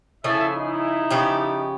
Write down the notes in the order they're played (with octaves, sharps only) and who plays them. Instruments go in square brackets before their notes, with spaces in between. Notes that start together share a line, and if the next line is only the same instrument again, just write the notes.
[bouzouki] C#3 F3 G#4 [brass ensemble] E4 A4 E5
[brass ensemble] D#4 E4
[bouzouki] C#3 F3 G4